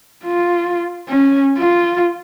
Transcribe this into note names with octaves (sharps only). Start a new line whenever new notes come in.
F4
C#4
F4